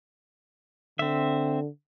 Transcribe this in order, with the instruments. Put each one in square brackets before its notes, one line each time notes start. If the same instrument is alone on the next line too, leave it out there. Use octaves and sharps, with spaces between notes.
[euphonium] D3 [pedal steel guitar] C4 E5